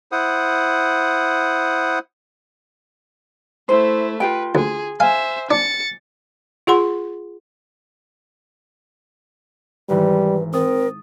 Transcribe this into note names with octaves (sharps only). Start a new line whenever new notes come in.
E4 C5 F#5 D#6
A3 E4 C5
F4 G4 B4 G5
D2 G#4
C5 E5 F5 G#5
D4 A6 C#7
F4 G#4 F#5 C6
G#1 E3 G3 B4
C4 A#4 D#6 A6